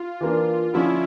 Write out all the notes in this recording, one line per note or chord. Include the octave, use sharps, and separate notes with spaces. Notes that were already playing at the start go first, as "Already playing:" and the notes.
Already playing: F4
E3 A#3 D4
D3 F3 C#4 E4